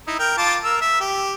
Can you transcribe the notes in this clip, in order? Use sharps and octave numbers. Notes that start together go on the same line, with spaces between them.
D#4 E4
A#4 G5
F4 A5 D6
A#4 E6
E5
G4